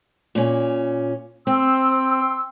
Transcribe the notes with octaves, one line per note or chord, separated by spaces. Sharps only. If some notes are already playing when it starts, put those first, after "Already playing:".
A#2 C#4
C4 G5 C6 E6